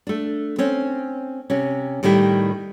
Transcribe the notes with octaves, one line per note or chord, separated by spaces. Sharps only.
A3 D4
C4 C#4
C3 C#4
A2 D#3 G3 E4 G4